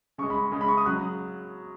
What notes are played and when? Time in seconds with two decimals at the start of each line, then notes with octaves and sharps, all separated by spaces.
0.18 C#3 G#3 C#6
0.30 B5
0.52 C#3 G#3
0.61 B5
0.68 C#6
0.77 D#6
0.86 C#3 F#3 F#6